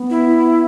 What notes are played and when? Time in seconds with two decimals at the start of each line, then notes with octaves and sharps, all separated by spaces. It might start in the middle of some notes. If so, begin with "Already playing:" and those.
Already playing: B3
0.10 E4